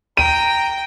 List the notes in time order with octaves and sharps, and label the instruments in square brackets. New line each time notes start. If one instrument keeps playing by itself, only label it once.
[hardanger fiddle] G5 [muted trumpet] A#5 [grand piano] D#7